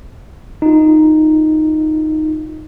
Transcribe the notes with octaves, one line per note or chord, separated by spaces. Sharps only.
D#4 F4